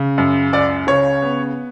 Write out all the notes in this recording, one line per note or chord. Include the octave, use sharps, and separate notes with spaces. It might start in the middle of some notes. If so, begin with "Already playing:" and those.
Already playing: C#3
F#2
C#2 D5
C#3 C#5
B3